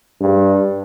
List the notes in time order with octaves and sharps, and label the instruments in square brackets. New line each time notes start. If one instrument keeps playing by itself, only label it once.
[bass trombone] G2